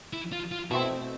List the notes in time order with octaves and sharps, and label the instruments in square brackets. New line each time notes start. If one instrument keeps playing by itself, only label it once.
[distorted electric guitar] E4
F4
F4
[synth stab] B2 A3 C4 [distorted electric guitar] E4